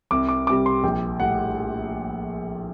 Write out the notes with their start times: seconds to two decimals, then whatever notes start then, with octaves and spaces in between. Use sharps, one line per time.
0.11 C2 D6
0.29 D6
0.47 C3 G3 D6
0.66 C6
0.83 A#1 G5
1.20 A2 G3 F#5